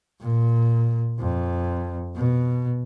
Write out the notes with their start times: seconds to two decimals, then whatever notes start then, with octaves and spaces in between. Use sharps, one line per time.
0.21 A#2
1.20 F2
2.16 B2